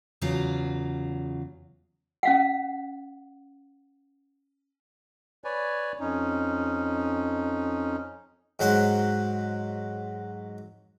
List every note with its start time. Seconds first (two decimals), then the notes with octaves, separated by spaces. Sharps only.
0.21 E2 C#3 F#3 F4 F5
2.23 C#4 F5 F#5
5.44 B4 C#5 D5 G#5
6.00 F2 C#4 D#4
8.59 G#2 F#3 C5 F#5